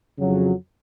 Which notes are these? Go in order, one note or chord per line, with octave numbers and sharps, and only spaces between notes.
F2 C#3 F#3